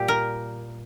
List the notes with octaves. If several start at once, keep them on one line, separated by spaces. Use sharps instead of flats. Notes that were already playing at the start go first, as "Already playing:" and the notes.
Already playing: A#2 G3 G4
A#4